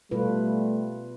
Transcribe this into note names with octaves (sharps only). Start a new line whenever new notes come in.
B2 G3 A3 F4 B4